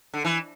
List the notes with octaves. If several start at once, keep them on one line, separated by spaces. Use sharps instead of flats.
D3
E3